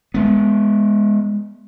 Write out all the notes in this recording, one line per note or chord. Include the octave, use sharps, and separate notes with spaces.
G#3 B3